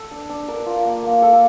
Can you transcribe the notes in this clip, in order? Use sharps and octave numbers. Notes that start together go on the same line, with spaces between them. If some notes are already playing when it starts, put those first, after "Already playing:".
Already playing: A4
D4
D4
D4 A#4
F4
A#3
A#3
A#3 A4